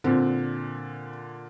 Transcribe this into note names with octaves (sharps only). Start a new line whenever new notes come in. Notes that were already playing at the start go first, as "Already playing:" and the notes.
A#2 D3 C4